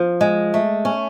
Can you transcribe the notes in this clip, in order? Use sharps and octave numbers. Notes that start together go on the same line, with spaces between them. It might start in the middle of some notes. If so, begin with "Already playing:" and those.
Already playing: F3
G#3
A3
C#4